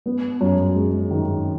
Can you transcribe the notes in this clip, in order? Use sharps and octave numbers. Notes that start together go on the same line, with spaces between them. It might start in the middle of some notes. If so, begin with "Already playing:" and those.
B3
F#2
G#3
D#3